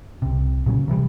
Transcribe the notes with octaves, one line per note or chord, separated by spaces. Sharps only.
C2 C3
A#2 C#3 F#3
C3 E3 F#3 G3